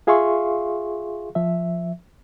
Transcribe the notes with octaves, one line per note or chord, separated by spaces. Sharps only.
F4 G#4 E5 F5 C6 C#6
F3 E5